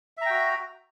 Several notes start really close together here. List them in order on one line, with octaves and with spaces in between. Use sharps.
E5 A#5 G5 F#4